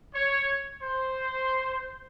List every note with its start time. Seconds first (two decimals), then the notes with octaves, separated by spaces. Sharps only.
0.14 C#5
0.82 C5